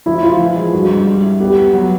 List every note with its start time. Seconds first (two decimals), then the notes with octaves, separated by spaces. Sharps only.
0.06 F3 E4
0.23 F3 F4
0.39 E3
0.56 G#3
0.73 G2 F#4
0.90 G2
1.06 G3
1.24 E4
1.40 B3 G4
1.57 B3
1.74 F#3